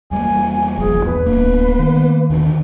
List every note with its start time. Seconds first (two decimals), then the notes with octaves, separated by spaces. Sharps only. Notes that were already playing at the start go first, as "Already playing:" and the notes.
0.11 E2 G3 A#3 G#5
0.78 F#1 F3 G#4
1.05 E2 B4
1.26 D1 A#3 B3 D4
1.79 D#3
2.30 D#2 D3